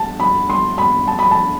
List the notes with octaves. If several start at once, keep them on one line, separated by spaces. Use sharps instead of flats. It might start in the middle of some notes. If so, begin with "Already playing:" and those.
Already playing: A5
B5
C6
B5
A5
B5
A5